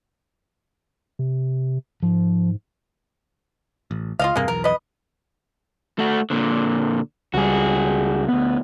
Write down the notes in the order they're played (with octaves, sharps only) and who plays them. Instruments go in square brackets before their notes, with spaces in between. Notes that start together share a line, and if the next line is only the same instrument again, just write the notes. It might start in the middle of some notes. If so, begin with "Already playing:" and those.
[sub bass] C3
[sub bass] G#2 [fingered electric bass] F3
[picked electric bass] A1
[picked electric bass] C#2 [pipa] F4 D#5 F5
[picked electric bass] E1 G2 C3 [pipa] G#3 A#3
[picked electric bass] B1 E2 [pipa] A#4
[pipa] B4 D#5
[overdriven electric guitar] A3 F#4
A#2 D3
[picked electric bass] C#2 G3 [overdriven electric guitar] F#4 G#4
[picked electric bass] D2 B3